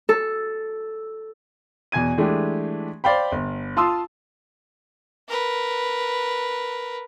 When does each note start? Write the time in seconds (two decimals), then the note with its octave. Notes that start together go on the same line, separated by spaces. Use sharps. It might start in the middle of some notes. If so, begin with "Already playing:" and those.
0.09 A4
1.92 E2 B2 G#5 G#6 D#7
2.18 E3 G#3 A3 D4 G4
3.04 C5 D5 F5 G5 B5
3.32 G1
3.77 F4 F5 A5 C6 D#6 E6
5.28 A#4 B4